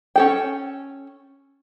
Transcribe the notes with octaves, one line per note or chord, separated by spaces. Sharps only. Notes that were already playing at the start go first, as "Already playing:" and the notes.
C#4 A4 G5